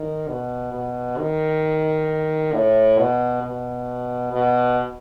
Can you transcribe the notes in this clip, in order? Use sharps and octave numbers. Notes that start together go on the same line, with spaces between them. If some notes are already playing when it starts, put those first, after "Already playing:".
Already playing: D#3
B2
B2
D#3
A2
B2
B2
B2